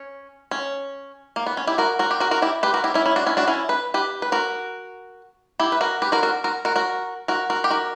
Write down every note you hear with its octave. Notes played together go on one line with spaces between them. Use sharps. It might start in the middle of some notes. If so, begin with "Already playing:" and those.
Already playing: C#4
C#4
A#3
B3
C#4
E4 G4
F#4 A#4
F#4 A#4
G4
F#4 A#4
F#4 A#4
E4 G4
G4 B4
F#4 A#4
E4 G4
C#4 E4
C#4 E4
D4 F#4
C#4 E4
D4 F#4
C#4 E4
B4
G4 B4
B4
F#4 A#4
E4 G4
B4
F#4 A#4
G4 B4
F#4 A#4
F#4 A#4
F#4 A#4
F#4 A#4
F#4 A#4
F#4 A#4
F#4 A#4
G4
F#4 A#4